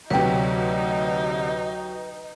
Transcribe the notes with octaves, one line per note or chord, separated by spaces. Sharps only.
D2 C3 F#3 D#4 B4 G5